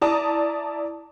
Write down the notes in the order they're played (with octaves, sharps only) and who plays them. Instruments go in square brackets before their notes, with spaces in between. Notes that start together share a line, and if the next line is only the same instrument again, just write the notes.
[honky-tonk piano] E4 D5 A5 A#5 D#6